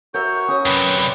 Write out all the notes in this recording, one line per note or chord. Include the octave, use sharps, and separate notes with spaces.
F#4 A#4 C#5 E5 G6
C#4 C#6 D#6
F#2 C3 B4 G5
D5 B5